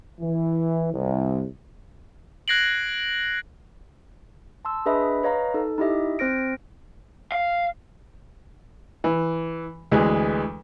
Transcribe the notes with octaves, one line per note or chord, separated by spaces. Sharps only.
E3
C2
F#6 G#6 A#6 C7 D7 F#7
A5 C6 E6
D4 G#4 B4 D#5 E5 B5
B4 C#5 D#5 F5 A#5
D#4 A4
D#4 E4 G4 D#5 E5
C4 C5 F6 A#6 D7
F5
E3
D2 E3 G#3 B4